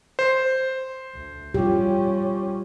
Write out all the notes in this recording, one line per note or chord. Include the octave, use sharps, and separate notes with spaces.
C5
D2
G3 C#4 F4 G4